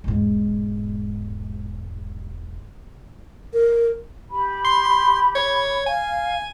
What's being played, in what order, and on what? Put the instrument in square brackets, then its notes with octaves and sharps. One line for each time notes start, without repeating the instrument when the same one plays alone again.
[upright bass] E1 G#2
[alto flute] A#4
[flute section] G4 B5
[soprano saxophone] C6
C#5
[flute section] F5 [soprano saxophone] G#5